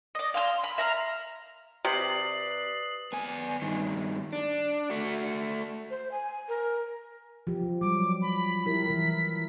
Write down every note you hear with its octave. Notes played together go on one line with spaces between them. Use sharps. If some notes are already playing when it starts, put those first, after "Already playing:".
D5 D#5
F5 C6 E6 F6
B5
E5 A#5 C6 F6
C3 B4 D5 D#6 C7 F#7
B3 G#5
G2 D#3
D4
A3 F#4
C5
G#5
A#4
F3 G4
F#3 G3 D6
B5
E4 G4 A#4 B6
E3 A#4